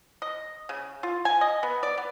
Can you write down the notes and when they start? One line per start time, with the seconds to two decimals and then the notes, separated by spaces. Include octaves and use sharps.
0.22 D#5
0.69 C#3
1.03 F4
1.25 G#5
1.41 D#5
1.63 B3
1.83 D5
1.98 B3